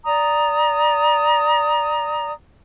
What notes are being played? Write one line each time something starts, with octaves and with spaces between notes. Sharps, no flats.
D5 A#5 D#6